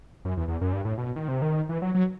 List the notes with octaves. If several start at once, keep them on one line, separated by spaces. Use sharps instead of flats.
F#2
E2
E2
F#2
G2
A2
B2
D#3
C3
D#3
E3
F#3
F#3